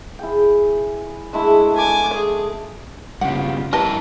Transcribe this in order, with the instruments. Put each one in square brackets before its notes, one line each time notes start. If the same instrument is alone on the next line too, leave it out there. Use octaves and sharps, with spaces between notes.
[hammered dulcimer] E4 G#4 G5
[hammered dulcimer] D3 G#3 A3 [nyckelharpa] E4
[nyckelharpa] G#5 D6
G#4
[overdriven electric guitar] G2 C#3 [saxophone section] B3 F4 G4 [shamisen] F#5
[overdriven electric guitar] G2 A#4 [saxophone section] E4 B4 [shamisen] G4 D#5 A5